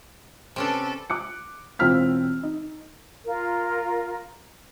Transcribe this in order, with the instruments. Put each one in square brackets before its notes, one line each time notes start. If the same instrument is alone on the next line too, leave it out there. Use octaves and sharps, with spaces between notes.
[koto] C3 C#4 D4 [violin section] A4 B4
[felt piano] D6 F#6 C#7
E1 C4 F4 E6 F6 B6
D#4
[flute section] F4 A#4